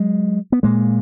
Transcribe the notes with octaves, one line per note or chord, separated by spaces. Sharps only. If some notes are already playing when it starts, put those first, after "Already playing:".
Already playing: F#3 G#3
B3
A#2 G#3 A#3